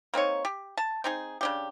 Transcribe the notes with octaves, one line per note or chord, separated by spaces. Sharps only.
A#3 C4 D#4 C#5
G4
A5
C4 D#4 G#4
C#3 D4 G4